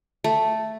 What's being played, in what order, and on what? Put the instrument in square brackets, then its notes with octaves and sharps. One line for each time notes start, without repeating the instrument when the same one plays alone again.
[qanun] A3